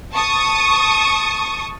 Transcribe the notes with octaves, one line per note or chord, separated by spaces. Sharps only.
A5 C#6 D#6